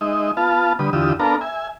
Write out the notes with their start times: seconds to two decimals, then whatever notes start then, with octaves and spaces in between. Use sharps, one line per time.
0.01 G#3 D#4 D#5 E5
0.37 B3 F4 F5 A5
0.79 D3 G3 B4 D#6
0.93 E2 D3 F4 G4 D#6 E6
1.20 B3 D4 A4 A#4 F5 A#5
1.41 E5 G#5